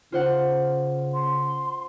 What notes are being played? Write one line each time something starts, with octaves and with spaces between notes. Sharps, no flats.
C#3 F4 C5 F#5
C6